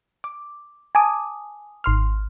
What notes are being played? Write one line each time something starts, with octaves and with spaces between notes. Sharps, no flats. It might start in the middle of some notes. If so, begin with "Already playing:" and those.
D6
G#5 A5 D6 D#6
G#1 C6 F6